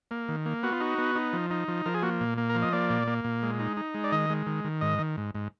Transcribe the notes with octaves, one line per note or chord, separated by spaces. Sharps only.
A#3
D#3
A#3
B3 F#4
F4
D#4 F#4
B3
D#4
F3
D#4
F3
F3 A#4
G#4
A#3 F#4
A#2
A#3
A#4
F3
D#5
A#3 D5
A#2
A#3
A#2
G#3
D#4
D#4
G#3
D5
D#3 D#5
G#3
D#3
D#3
G#2 D#5
D#3
G#2
G#2